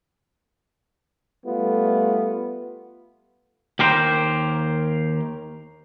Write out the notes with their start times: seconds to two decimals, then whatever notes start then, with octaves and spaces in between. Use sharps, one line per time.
1.45 G3 A3 B3 F4
3.79 D#2 G4 A#4 C5